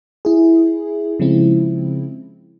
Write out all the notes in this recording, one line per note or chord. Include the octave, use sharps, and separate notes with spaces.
E4 G#4
C#3 F3 G#3 C4 E4